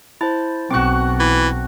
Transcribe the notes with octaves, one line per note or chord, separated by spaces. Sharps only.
E4 C5 A5
B1 C4 F#4 C#6 D6 F#6
E3